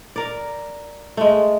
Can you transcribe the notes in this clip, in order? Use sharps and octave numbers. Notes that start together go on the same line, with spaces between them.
A#4 D5
G#3 A3